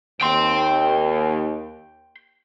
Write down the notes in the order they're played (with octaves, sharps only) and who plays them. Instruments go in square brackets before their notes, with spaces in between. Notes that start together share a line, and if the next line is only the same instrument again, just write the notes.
[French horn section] D#2 [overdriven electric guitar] G5 C6